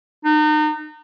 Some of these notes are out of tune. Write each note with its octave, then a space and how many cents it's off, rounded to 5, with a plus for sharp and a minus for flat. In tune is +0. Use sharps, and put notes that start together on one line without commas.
D#4 -35